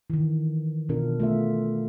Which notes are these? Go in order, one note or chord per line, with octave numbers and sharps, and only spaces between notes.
D#3 E3
B2 D4 F4 A#4
A3 F4 E5